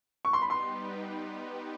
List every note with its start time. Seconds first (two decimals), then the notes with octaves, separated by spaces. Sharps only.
0.25 G3 B3 D#4 G4 B4 C#6
0.33 C6
0.42 B5
0.50 C6